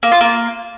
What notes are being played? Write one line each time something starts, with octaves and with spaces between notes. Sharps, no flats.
A#3
F4
A#3